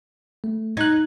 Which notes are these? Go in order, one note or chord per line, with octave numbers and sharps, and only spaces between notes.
A3
D#4 F#6 G#6